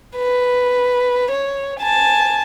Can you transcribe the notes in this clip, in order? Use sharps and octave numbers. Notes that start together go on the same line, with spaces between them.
B4
C#5
G#5 A5